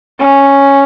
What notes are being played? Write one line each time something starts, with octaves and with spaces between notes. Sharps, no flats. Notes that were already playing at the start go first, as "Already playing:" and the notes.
C#4